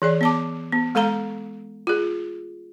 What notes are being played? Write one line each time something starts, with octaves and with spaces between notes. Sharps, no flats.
E3 G#4 D5
B3 A5 D6
B3
G#3 A4 F5 A#5
F4 G#4